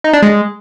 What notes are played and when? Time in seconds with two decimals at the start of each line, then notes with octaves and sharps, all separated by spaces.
0.04 D#4
0.13 D4
0.23 G#3